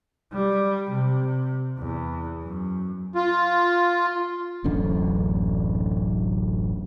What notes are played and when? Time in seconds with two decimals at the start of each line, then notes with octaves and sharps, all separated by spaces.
0.33 G3
0.90 C3
1.78 E2
2.43 F#2
3.15 F4
4.64 D1 A1 F#2 D3